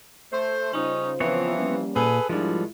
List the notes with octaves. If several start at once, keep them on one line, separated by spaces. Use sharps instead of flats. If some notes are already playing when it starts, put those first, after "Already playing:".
A3 C5
C#3 G3 C#4 D#4 F4 C5
E3 F3 B3 C4 C#5
G3 A#3 C#4
A#2 G#4 A4 B4
G#2 D#3 F3 G3 G#3 D4 E4 F4